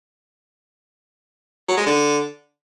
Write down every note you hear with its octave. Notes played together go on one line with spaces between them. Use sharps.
F#3
G#3
D3